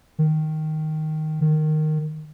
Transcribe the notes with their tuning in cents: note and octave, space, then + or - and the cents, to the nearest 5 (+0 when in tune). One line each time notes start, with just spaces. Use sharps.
D#3 +0
D#3 -10